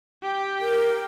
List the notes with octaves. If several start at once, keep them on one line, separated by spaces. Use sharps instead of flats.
G4 G5
A#4